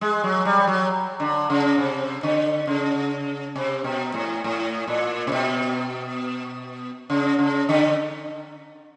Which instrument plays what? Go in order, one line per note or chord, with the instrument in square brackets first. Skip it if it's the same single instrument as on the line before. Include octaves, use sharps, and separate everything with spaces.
[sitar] G#3
F#3
G3
F#3
D3
C#3
C3
D3
C#3
C3
B2
A2
A2
A#2
C3
B2
C#3
C#3
D3